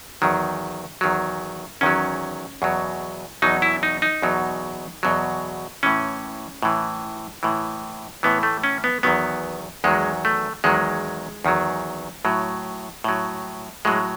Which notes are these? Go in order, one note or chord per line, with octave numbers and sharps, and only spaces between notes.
E2 D#3 F#3
E2 D#3 F#3
E2 D#3 F#3 C#4
E2 B2 F#3
E2 B2 F#3 D#4
E4
D#4
D#4
E2 B2 F#3
E2 B2 F#3
A2 E3 C#4
A2 E3
A2 E3
A2 E3 B3
A3
C#4
B3
E2 D#3 F#3 B3
E2 D#3 F#3 G#3
A3
E2 D#3 F#3 G#3
E2 D#3 F#3
A2 F#3
A2 F#3
A2 F#3 G#3